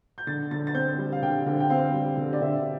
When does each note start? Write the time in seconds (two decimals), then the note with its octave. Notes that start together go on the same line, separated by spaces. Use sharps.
0.18 G6
0.27 D3 A6
0.51 D3 A6
0.67 A6
0.74 C4 G6
0.98 G3
1.12 F5
1.22 D3 G5
1.46 D3 F5
1.60 G5
1.70 C4 F5
1.94 G3
2.17 D3
2.33 D5
2.41 D3 E5